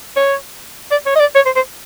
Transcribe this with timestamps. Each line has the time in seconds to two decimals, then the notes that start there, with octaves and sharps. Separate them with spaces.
0.16 C#5
0.91 D5
1.06 C#5
1.15 D#5
1.20 D5
1.35 C#5
1.46 C5
1.56 C5